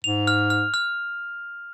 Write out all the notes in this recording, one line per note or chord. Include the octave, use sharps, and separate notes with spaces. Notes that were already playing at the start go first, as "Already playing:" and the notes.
G#2 F7
F6
F6
F6